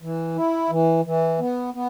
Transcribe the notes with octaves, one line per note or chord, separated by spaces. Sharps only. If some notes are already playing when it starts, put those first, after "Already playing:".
E3
E4
E3
E3
B3
B3